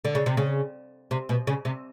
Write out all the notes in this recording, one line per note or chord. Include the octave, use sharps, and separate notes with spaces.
D3
C#3
C3
C#3
C3
B2
C#3
C3